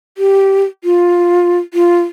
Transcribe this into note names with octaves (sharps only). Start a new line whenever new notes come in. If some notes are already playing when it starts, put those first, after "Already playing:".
G4
F4
F4